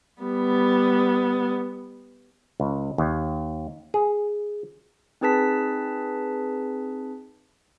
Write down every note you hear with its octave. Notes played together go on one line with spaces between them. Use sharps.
G3 B3
C#2
D#2
G#4
C4 D#4 G#4 B4 A5 B6